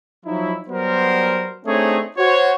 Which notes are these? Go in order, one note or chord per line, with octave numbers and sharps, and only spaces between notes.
F3 F#3 D#4 E4
F#3 G3 B3 A#4 C5
A3 C4 D4 D#4 G#4 C#5
F#4 C5 C#5